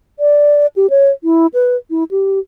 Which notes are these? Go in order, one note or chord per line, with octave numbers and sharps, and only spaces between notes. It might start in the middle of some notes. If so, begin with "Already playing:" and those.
D5
G4
C#5
E4
B4
E4
G4